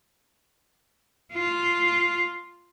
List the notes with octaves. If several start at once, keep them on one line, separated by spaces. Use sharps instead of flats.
F4